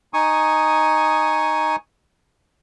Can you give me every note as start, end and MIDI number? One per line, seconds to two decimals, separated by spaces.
0.14 1.76 63
0.14 1.76 80
0.14 1.76 85
0.14 1.76 87